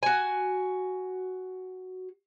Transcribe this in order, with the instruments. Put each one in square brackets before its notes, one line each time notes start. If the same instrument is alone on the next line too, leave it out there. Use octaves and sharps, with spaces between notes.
[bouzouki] F#4 G#5